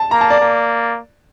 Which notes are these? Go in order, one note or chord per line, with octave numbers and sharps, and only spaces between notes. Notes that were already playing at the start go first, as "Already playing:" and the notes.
Already playing: A5
A#3 A#5
A5
D5
A#3